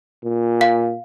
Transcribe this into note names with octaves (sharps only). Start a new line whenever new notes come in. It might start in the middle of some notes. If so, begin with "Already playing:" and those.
A#2
F5